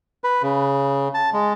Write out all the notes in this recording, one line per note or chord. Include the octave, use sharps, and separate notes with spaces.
B4
C#3
A5
G#3